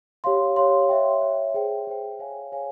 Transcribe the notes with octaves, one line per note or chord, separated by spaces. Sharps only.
G4 C#5 F5 C6
G4 C#5 F5 C6
C#5 E5 G5
C#5 E5 G5
G#4 C5 G5
G#4 C5 G5
G#4 C#5 F5 G#5
G#4 C#5 F5 G#5